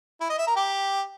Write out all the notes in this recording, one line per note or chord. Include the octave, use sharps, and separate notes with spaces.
E4
D#5
E5
A#4
G4